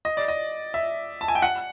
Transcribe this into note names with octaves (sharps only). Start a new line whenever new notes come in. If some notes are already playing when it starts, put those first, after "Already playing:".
D#5
D5
D#5
E5
A5
G#5
G5
F#5